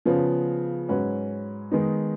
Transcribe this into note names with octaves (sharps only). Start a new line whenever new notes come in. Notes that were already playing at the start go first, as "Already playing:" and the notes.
C#3 F3 B3
G#2 F#3 C#4 F#4 B4
D#3 G#3 B3 D#4